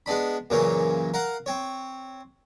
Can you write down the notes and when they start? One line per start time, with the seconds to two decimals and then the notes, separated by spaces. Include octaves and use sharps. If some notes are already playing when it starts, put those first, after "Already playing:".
0.06 G#3 B3 D4 B5
0.50 F#2 A#2 C#3 E3 A#3 C#5
1.14 A#4 F5 F#5
1.46 C4 C#5